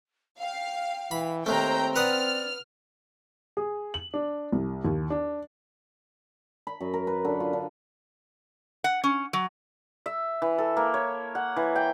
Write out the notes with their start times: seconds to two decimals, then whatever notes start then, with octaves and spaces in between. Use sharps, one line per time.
0.40 F5 G5
1.11 E3 B5
1.46 D#2 A3 C4 C5 G5 A#5
1.96 B4 D5 F#5 D#6 F6
3.57 G#4
3.94 F#7
4.14 D4
4.52 C2
4.85 D#2
5.10 D4
6.67 B5
6.80 F#2
6.94 A#4
7.07 B4
7.25 D3
7.40 F4
7.53 D3
8.84 F#5
9.04 C#4
9.33 F#3
10.06 E5
10.42 E3
10.58 A4
10.77 A#3
10.94 C#5
11.35 F#5
11.56 E3
11.76 G5